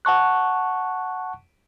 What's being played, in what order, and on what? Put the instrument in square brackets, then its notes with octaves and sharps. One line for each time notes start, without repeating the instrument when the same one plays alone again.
[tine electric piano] F#5 A5 C#6 F#6